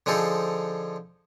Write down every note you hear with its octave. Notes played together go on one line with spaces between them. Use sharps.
D3 F3 D#4 G#4 A4 C5